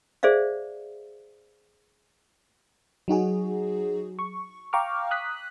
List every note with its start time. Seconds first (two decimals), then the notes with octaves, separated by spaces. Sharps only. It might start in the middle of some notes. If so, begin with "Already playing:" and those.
0.23 G#4 C5 D5 E5 F5
3.08 F#3 D#4 F#4 G#4
4.19 C#6
4.73 F5 G5 A#5 C#6 D6 F6
5.11 D#6 F#6 B6